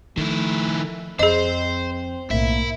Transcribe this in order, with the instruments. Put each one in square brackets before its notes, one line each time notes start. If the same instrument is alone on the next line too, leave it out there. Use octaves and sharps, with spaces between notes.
[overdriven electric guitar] D#3 E4 [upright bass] F3 [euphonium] A3
[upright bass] F2 [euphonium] C4 [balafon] G#4 D#5 [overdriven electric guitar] C5
[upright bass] B1 A2 [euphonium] A#3 [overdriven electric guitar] E4 E5